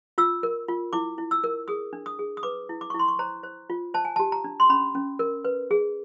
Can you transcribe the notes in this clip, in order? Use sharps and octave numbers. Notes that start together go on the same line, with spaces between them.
F4 E6
A#4
F4
E4 D6
E4
E6
A#4
G#4 D#6
D4
D#6
G#4
D#6
B4 D6
E4
D6
C#6
E4
C6
C#6
C5 A#5
C5
F4
C5 A5
G#5
G4 A5
A#5
D4
C6
C#4 B5
C#4
A#4
B4
G#4